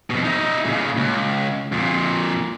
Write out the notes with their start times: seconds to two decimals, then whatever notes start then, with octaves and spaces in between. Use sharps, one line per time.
0.10 F2 B2
0.24 D#4 E5
0.65 A#2 C#3
0.97 C#2
1.72 F2 A#2